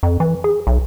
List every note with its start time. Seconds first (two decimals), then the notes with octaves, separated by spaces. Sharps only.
0.03 F2
0.20 E3
0.44 G#4
0.67 B1